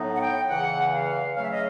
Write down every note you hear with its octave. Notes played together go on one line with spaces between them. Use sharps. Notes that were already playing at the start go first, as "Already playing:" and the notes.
Already playing: A2 F#3 B3 D#4
F#5
G5
E2 C#3 E3 F#5
F5
C#3 F#3 A3 F5
E5
D#5